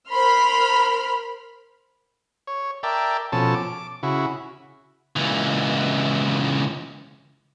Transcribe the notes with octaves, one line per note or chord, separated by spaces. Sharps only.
A#4 C5 B5 C6 F6
C#5
A#4 D5 E5 G5 A5
B2 F3 C#4 A4 A5
D6
C#3 E4 F#4
C#2 E3